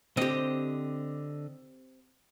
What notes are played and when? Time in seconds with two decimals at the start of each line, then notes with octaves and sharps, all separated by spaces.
0.17 D3 C4 G4 D#5